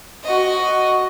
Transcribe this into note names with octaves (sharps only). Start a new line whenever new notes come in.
F#4 D#5